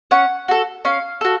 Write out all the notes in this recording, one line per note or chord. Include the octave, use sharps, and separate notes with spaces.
C#4 F#5
F#4 A4
C#4 F5
F#4 A4